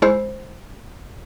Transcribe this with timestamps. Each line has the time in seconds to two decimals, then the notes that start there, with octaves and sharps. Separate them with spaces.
0.02 G#3 E4 C5